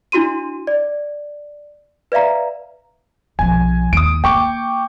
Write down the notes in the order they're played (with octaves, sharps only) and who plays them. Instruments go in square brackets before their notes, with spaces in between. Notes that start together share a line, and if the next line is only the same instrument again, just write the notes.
[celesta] D4 E4 F#4 C6 D#7
D5
B4 D5 E5 F5 A#5
[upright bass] B1 F3 [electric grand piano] G#5
[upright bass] D#2 [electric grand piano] D#6 D7
[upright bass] A#3 [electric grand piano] G5 C#6 D6